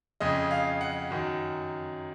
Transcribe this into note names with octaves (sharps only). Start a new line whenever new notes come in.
F2 C#3 D#5
F5
F#5
F#2 D#3